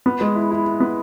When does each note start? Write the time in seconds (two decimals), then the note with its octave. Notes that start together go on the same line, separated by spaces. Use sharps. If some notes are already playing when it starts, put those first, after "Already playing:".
0.06 B3
0.21 G#3
0.35 E4
0.51 E4
0.66 E4
0.80 B3